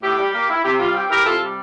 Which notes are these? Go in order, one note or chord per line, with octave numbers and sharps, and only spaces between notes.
A2 G4
G3
A#3
E4
C3 G4
G3 F4
C4 G4
E4 G4 A#4
C3 F4 A4
G3